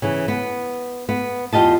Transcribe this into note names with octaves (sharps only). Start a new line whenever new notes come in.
C#3 E3
B3
B3
E2 F4 G4 D#5 A5